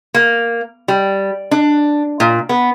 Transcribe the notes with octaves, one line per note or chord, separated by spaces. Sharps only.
A#3
G3
D4
A#2
B3